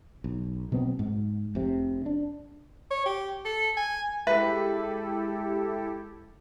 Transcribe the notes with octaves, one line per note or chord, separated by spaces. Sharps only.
B1
B2 F#3 B3 C4
G#2
F1 C3
D4
C#5
G4
A4
G#5
G#3 E4 G4 A4 B4 E5